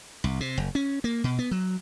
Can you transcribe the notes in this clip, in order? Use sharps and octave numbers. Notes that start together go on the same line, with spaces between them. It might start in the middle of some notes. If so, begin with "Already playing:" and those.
C2
C3
F#1
C#4
A#3
B2
B3
F#3